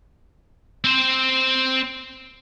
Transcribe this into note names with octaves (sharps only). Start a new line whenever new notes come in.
C4 C5